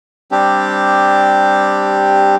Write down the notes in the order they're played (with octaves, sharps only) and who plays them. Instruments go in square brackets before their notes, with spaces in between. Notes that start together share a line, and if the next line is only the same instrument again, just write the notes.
[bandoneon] G3 C4 D4 G4